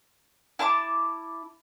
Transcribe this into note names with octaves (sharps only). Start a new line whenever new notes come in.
E4 A5 B5 D6